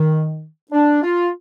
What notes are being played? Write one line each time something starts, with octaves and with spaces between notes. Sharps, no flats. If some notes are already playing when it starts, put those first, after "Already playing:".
Already playing: D#3
D4
F4